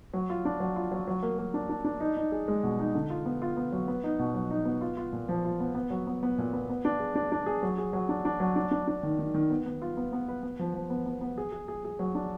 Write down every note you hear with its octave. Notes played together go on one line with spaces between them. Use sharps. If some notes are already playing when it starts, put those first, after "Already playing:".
F#3
F4
D4
F#3
F4
F#3
F#3
A#3
A#3
D4
D4
D4
D#4
D#4
G#4
G#3
B2
D#4
D3
F4
B3
F4
B3
F#3
B3
D#4
B2
F#3
D#4
B3
F4
F4
A#2
F3
F4
B3
B3
F#3
B3
B3
A#2
B3
B3
D4
G#4
D4
D4
G#4
F#3
G#4
F#3
D4
D4
F#3
D4
D4
D4
D#3
D#3
D#3
B3
B3
F4
B3
B3
B4
B3
F3
F3
B3
B3
B3
G#4
G#4
G#4
G#4
F#3
D4